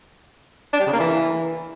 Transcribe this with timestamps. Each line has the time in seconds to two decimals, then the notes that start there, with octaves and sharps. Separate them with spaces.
0.73 D4
0.80 G3
0.87 C#3
0.93 A#3
1.00 E3